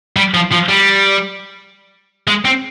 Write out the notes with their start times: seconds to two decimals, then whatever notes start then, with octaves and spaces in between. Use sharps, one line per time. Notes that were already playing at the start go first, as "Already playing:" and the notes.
0.17 G3
0.34 F3
0.52 F3
0.69 G3
2.28 G#3
2.45 C4